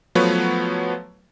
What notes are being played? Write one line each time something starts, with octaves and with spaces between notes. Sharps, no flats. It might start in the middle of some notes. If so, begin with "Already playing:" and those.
F3 F#3 A3 B3 B4 C#5